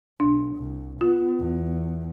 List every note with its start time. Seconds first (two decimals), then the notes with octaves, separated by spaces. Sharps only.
0.20 B1 D4
0.56 C2
1.01 B3 F4
1.39 E2